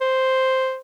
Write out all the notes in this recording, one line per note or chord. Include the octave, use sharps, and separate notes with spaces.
C5